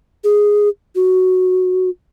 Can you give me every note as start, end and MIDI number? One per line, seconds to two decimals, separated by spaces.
0.24 0.69 68
0.95 1.90 66